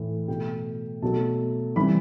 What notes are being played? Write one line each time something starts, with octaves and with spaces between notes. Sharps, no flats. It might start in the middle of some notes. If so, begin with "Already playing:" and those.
Already playing: A2 E3 A3
B2 A3 G5
B2 F#3 A3 A5
C3 E3 G3 B5